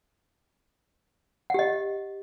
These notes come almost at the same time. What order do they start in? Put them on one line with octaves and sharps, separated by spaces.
F#5 G4 D#5